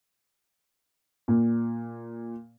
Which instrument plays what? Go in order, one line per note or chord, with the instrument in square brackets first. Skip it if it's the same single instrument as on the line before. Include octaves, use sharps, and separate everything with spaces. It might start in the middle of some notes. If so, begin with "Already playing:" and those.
[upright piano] A#2